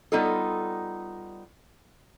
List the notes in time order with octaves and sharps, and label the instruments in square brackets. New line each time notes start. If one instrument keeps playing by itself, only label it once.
[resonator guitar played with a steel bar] G3 B3 D#4 F4 A4